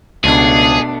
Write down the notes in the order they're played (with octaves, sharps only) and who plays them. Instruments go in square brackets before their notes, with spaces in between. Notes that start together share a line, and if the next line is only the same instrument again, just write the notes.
[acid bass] C#2 [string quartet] B2 A3 D4 [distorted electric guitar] G#4